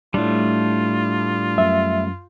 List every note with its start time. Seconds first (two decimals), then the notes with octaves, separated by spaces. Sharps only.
0.14 A2 G3 A3 D4 F4
1.58 F#2 E5